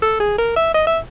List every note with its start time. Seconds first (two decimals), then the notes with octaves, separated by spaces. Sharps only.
0.02 A4
0.20 G#4
0.38 A#4
0.56 E5
0.74 D#5
0.87 E5